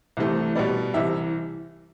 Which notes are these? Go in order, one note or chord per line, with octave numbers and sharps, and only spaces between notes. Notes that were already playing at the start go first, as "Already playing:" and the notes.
C2 C3 E3 A3
B2 G3 B3 D5
C2 C3 E3 E5